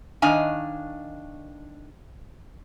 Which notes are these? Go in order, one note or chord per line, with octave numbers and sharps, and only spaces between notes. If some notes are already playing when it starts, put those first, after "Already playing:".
D#3 D4 D#5 F5 G#5